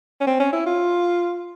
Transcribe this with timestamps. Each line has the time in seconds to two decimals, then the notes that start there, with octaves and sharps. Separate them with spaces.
0.21 C#4
0.27 C4
0.40 C#4
0.53 E4
0.66 F4